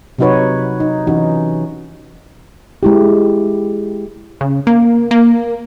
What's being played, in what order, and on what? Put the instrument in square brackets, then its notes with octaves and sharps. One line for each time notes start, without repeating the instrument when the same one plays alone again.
[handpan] C3 F#3 D#4 F#4 B4 C#5
D#4
E3 C#4 D#4 F#4
G#3 E4 G4
[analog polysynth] C#3
A#3
A#3